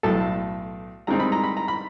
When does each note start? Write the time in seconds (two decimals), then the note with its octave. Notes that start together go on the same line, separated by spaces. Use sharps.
0.03 B1 A2 F#3 A4 A5
1.07 G2 D#3 G#3 C4 D#4 A#5
1.20 B5
1.32 A#5
1.44 B5
1.57 A#5
1.68 B5